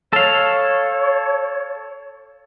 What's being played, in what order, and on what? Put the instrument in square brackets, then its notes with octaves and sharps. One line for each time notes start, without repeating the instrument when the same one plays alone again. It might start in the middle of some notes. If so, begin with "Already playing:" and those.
[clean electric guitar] A4 F5 [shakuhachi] C#5